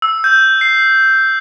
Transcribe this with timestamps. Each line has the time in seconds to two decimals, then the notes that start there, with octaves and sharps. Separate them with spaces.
0.02 E6
0.24 G6
0.61 C7